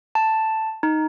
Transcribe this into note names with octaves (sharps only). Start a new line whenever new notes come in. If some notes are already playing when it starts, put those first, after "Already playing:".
A5
D#4